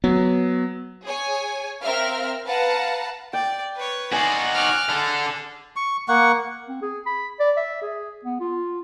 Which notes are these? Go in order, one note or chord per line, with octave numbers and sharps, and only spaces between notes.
F#3 B3
G#4 C#5 G#5
C4 A#4 E5 F5 F6
B4 F5 F#5 A5 A#5
D5 G5
B4 C#5
D#4 F#4 D5 G#5 C6
C#5 D6 F6 F#6
D3 G#4 A4
C#6
A#3 F#5 C#6
C4
G#4
B5
D5
E5
G#4
B3
F4